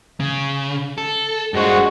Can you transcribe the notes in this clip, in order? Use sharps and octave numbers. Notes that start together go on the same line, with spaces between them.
C#3
A4
A#1 G2 G#3 F#4 C5